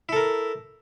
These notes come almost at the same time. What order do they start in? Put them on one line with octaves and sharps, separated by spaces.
E4 A4 A#4